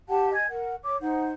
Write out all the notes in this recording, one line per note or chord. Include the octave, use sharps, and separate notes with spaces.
G4 F#5 G5 A5
D#5 G#5 G#6
A#4 F#5
C#5 D6
D#4 C5 F#5